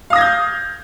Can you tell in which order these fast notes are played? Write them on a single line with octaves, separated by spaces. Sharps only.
F5 D#6 A#6 G#6 G6